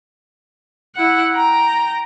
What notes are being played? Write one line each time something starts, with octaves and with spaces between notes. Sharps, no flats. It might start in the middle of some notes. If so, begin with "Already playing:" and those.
E4 F#5
G5 A#5